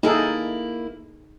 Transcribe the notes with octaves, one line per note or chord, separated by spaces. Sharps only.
A#3 D#4 E4 G#4 A4